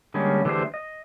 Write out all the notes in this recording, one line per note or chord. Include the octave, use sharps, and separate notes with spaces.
D3 G3 G#3 A#3 C#4
D3 E3 A3 G4 G#4 C5
D#5